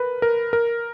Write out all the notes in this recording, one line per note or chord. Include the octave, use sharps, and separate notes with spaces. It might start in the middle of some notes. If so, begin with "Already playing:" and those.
Already playing: A#4 B4
A#4
A#4